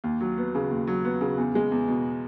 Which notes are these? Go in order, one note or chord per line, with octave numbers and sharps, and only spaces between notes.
D#2
F#3
B3
C#3
D#2
F#3
B3
C#3
E2
G#3
E2
B2